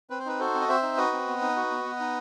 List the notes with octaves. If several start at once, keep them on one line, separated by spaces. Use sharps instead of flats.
C4 B4
C5
D#4 B4
F#4 A4 C5
C4
D#5
C4 C5 E5
D#4
F#4 B4 D#5
C4
B3
D#4
F#4
B3
B3
D#4